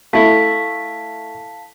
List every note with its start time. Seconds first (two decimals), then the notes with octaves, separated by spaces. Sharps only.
0.13 A3 E4 F5 A5 B6